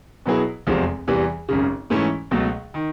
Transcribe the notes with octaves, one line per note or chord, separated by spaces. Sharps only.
B2 F#3 B3 E4 G#4
F1 E2 C3 F3 G#3
E2 C3 E3 G3
G#1 F#2 C#3
G#2 E3 A3 C#4 E4
C#2 B2 F#3 A3
D#3